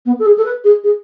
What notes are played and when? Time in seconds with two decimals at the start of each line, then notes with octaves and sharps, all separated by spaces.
0.06 B3
0.19 A4
0.26 G#4
0.38 A4
0.45 B4
0.64 G#4
0.84 G#4